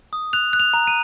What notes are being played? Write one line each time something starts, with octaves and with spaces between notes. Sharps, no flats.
D#6
F#6 F7
F#6
F7
A#5
D#7